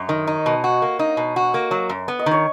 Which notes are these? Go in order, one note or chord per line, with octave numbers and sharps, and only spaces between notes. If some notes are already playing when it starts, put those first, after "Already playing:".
Already playing: F#2 C#5 D#5
D#3
D#4
B2
F#4
A#3
D#4
B2
F#4
A#3
F#3
F#2
B3
D#5
D#3
C#5